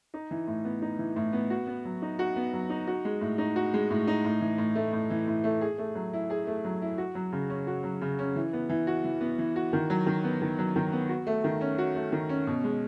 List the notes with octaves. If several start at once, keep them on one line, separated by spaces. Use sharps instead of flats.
D#4
E3
A2
B3
D#4
E3
A2
B3
F#4
B3
F#3
D#4
F#4
B3
F#3
D#4
F#4
G#3
A2
D#4
F#4
G#3
A2
D#4
A2
E3
A2
A3
A2
E3
A2
A3
G#4
A3
F#3
E4
G#4
A3
F#3
E4
F#4
F#3
C#3
C#4
F#4
F#3
C#3
C#4
E3
B3
E3
F#4
E3
B3
E3
F#4
D#3
F#3
D#3
B3
D#3
F#3
D#3
B3
F#4
A3
D#3
C#4
F#4
A3
D#3
C#4
B2
G#3